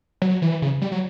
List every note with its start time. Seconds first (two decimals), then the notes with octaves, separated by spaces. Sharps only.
0.22 F#3
0.42 E3
0.62 C#3
0.82 G3
0.92 F#3